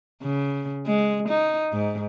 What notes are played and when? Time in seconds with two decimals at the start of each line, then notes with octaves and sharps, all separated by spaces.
0.22 C#3
0.86 G#3
1.29 D#4
1.72 G#2